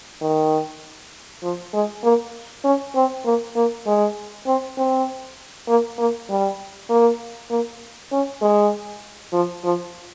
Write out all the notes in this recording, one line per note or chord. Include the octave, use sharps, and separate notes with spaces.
D#3
F3
G#3
A#3
C#4
C4
A#3
A#3
G#3
C4
C4
A#3
A#3
G3
A#3
A#3
C#4
G#3
F3
F3